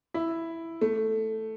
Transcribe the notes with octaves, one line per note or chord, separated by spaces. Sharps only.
E4
A3